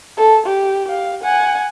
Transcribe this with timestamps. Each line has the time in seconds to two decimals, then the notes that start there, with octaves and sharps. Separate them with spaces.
0.17 A4
0.46 G4
0.88 G4 F5
1.22 F#5 G#5